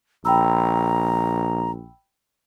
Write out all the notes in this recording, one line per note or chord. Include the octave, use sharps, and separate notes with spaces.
A#1 G5 A#5 B5 E6